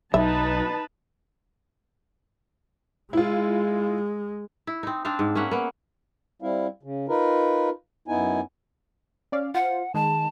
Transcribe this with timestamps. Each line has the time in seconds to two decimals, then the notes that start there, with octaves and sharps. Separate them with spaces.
0.14 B1 F#3 D#4 B4 E5 A5
3.13 G#3 E4 F4
4.67 E4
4.83 C4 D#4
5.05 C4 D4 C5 F5
5.19 G#2
5.35 A#3 C#4 E5 F#5
5.51 A#3 B3
6.42 G3 C4 E4 F5
6.83 C#3
7.09 D#4 F4 A#4 B4
8.08 F#2 B3 D#4 E4 G#5
9.32 C#4 D5 F5
9.54 F4 C5 F#5
9.94 D#3 G#3 A5